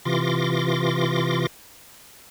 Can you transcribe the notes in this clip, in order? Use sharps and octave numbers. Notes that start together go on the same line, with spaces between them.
C3 E3 F4 C6 D6 A#6